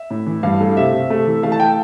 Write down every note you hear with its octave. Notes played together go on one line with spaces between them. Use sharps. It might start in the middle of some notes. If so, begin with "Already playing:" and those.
Already playing: E5
A2
E3
G2 F5
A3
C3 E5
C3
A3
E3
A3 F5
A5
G5